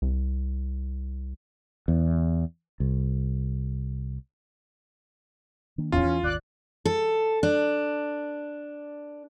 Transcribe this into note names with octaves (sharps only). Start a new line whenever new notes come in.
C2
E2
C2
D#3 A#3 D4
D1 G#1 E2 F3 C#4 F4
E3
G#1 D#2 D5 F#6
A4
D4